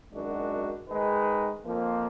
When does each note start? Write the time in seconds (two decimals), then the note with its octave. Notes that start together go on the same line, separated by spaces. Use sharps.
0.12 F#2 D#3 G#3 D4 F#4
0.89 D#3 G#3 D#4 G#4 B4
1.65 F2 F3 A#3